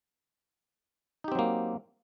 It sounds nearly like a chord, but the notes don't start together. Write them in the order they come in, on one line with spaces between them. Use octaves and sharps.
D#4 G4 C4 F#3 A#3